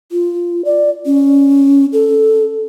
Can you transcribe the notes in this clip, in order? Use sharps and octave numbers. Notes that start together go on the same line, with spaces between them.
F4
D5
C#4
A4